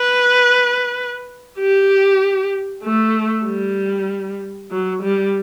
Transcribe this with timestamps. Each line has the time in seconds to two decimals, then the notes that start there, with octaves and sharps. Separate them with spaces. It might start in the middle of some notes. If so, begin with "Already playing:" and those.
Already playing: B4
1.59 G4
2.84 A3
3.46 G3
4.71 F#3
5.03 G3